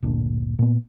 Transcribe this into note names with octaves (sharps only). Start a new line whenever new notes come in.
D1 G1 A#2 D4
A#2 B3